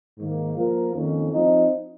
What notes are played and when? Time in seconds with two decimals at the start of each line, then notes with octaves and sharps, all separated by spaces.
0.18 G#2 D#3 A#3
0.56 F3 A#3 F4 A#4
0.95 F2 D#3 A#3 C#4
1.32 F3 C4 D#4